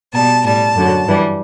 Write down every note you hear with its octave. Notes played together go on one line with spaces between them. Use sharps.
B2 G3 A5
A2 G3 A5
F#2 D3 F#3
G2 E3 G3